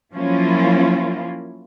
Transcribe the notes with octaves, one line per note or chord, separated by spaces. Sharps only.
F3 F#3 A#3 C#4 E4 F4